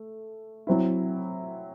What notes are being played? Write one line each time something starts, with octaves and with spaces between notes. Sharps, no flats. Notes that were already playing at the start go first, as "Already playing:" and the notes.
Already playing: A3
F#3 C4 E4